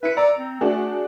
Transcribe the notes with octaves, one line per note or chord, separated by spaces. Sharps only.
E4 B4 C#7
D5 A#5 E6
C4
A3 D4 F#4 G#4